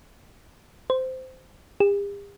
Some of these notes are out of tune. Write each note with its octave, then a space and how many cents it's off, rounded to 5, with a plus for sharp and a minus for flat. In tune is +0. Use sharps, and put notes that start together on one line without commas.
C5 -15
G4 +45